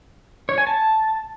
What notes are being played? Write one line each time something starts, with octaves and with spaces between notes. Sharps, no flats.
C#5
G#5
A5